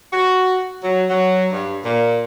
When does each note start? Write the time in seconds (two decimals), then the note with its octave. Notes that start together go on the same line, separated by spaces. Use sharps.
0.13 F#4
0.84 F#3
1.10 F#3
1.53 G2
1.84 A#2